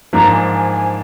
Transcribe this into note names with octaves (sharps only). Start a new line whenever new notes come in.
G#2 F3 A#3 D4 A#5
G#5
G#5
G#5